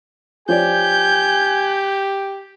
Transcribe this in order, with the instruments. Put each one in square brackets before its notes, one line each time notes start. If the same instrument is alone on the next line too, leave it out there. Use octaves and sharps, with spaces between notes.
[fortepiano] F3 C#5 D5 [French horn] G4 [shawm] G#5 [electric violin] G6